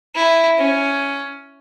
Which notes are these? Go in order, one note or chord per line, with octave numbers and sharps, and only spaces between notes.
E4
C#4